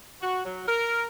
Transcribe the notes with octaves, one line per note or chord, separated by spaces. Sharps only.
F#4
F#3
A#4